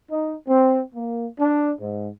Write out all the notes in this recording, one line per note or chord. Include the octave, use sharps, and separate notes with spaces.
D#4
C4
A#3
D4
G#2